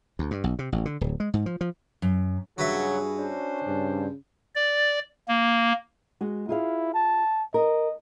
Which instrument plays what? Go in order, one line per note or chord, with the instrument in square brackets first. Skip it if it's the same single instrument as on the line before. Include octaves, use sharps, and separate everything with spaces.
[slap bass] D2
G2
B1
C3
A1
D3
D1
G#3
G#2
F3
F3
[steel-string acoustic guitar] F#2
[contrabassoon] G2 [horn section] C#3 F#3 [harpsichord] F#4 B4 E5 [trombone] G#4
[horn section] C#4 D4 C5
[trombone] G2 [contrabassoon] C#3
[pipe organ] D5
A#3
[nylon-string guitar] G#3 F#4
[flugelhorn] E4 [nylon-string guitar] F4 G#4 F5
[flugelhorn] A5
[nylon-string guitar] A#4 [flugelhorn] D#5